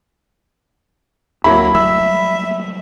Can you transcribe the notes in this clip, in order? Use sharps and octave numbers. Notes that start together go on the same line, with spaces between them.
D2 F#3 A#3 E4 B5
F#3 G3 A3 E5 E6